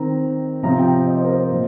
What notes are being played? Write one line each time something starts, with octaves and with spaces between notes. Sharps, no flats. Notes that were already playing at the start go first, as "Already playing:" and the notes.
Already playing: D#3 C4 A#5
C3 F3 C4 A#5
G5
D#5
C5
A#4
C5
A#2 F3